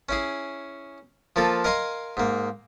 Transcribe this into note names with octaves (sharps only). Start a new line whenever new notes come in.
C#4 E4 G#4
F3 A#3 F4 A4
A#4 D#5 F5 G#5 A#5 C6
G#2 A#3